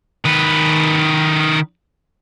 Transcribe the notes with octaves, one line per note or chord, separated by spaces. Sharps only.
D#3 B4